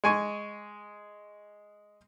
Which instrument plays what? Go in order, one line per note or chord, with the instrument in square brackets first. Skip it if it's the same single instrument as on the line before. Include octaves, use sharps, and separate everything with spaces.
[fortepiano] G#3 G#5 C#6